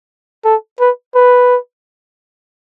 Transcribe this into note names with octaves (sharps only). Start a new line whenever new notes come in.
A4
B4
B4